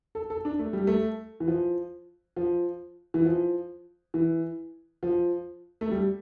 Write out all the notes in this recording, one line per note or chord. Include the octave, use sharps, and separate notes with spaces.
A4
A4
D4
A3
G3
A3
E3
F3
F3
E3
F3
E3
F3
A3
G3